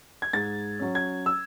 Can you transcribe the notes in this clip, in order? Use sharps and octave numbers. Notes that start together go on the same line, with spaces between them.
G#6
G#2 A6
F#3 C#4
G#6
E6